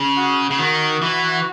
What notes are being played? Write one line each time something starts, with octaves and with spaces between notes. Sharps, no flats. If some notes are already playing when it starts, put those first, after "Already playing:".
Already playing: C#3
F#4
C#3
D#3 F#4
E3